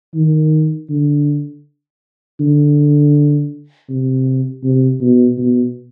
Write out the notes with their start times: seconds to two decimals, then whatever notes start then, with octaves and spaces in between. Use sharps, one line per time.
0.15 D#3
0.90 D3
2.40 D3
3.89 C3
4.64 C3
5.01 B2
5.38 B2